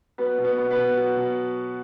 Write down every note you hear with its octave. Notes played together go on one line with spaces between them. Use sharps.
F#3 B3 B4
B2
B3 B4
B3
B3 B4
B2
F#3
B2